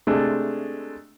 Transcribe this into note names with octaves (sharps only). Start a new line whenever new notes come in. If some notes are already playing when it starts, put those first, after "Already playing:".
C3 G#3 A3 D4